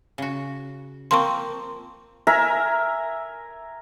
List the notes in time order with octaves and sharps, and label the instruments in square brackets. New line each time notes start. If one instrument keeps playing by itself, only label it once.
[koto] C#3 F#4
[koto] F3 A#3 C4 [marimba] C6 C#6
[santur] A#4 E5 G#5 A#5